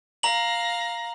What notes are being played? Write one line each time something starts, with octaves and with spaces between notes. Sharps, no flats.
F5 A#5 A#6 F#7